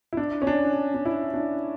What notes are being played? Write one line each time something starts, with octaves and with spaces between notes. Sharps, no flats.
E4
D4
C#4
D4
D4
E4
D4